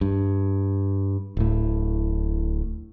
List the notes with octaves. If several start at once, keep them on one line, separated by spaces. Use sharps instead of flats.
G2
D1 A2